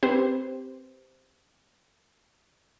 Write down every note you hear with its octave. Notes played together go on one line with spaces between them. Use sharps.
C4 G4 B4 C5